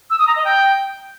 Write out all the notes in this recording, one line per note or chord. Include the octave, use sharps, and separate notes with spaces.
E6
D#6
A#5
D#5
G5